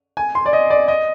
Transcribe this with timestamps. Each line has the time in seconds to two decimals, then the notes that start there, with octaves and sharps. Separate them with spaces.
0.17 G#5
0.35 C6
0.46 D5
0.53 D#5
0.70 D5
0.88 D#5